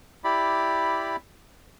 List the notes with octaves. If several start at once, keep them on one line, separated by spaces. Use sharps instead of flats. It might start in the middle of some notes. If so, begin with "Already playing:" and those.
E4 G4 D5 B5